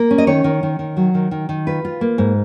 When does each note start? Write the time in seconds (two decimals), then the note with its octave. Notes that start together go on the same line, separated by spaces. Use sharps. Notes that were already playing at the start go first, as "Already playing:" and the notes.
Already playing: A#3
0.11 C#4
0.18 D#5
0.27 D#3 C#5
0.44 D#3
0.63 D#3
0.79 D#3
0.97 F#3
1.14 D#3
1.31 D#3
1.49 D#3
1.67 F4 B4
1.85 F4
2.01 A#3
2.18 G#2